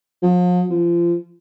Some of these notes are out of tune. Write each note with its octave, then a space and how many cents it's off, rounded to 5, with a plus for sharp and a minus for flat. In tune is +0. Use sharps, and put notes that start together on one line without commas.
F3 +40
F3 -30